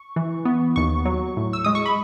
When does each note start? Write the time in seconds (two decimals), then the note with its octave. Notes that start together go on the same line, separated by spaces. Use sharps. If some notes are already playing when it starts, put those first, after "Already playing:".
Already playing: C#6
0.16 E3
0.45 B3
0.76 D#2 C#6
1.05 F#3
1.37 A2
1.53 E6
1.64 G#3 D#6
1.75 C#6
1.86 B5